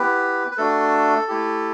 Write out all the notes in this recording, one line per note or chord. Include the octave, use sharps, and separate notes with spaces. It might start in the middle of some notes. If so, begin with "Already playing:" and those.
Already playing: B3 E4 G4 B4
B4
A3 D4 F#4 A4
A3 E4 G4